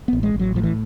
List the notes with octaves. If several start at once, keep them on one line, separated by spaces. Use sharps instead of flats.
A1 B3
G#3
A1
F#3
A2 F3
E3